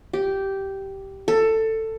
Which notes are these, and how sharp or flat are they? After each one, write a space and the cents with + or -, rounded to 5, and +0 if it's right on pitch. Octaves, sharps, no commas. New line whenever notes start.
G4 -10
A4 +15